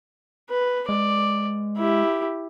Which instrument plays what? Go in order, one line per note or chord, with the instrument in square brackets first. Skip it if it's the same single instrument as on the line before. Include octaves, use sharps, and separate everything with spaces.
[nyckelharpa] B4
[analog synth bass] G#3 [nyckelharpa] D5
[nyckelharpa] E4 G4